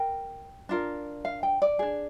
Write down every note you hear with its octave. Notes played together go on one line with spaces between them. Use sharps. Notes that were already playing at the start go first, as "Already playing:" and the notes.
Already playing: A#4 G5
D4 F4 A#4
F5
G5
D5
D4 G#4